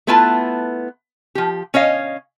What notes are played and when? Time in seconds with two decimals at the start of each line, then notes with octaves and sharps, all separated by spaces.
0.07 A3 B3 E4 F4 B4 A5
1.35 F3 G4
1.74 C#4 C#5 D#5 F5